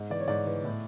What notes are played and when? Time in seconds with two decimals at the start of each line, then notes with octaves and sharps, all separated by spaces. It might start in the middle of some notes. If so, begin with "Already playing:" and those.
Already playing: G#2
0.10 E3 D5
0.20 C#5
0.28 G#2 D5
0.46 E3
0.64 A2